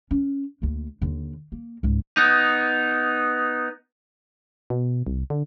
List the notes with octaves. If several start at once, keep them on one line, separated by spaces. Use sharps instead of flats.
C#4
D2 A#3
D#2 D3
A#3
C#2 G#2
B3 D#4
B2
C2
D3